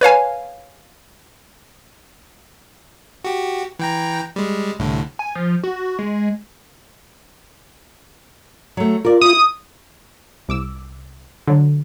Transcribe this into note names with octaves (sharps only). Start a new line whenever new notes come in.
B4 C#5 F5 G#5
F#4 G4
E3 G5 A#5
G3 G#3
C2 A2 D3
G#5
F3
F#4
G#3
F#3 A3
F4 A#4 D5
E4 D#6
C2 D6 E6
D3 F#3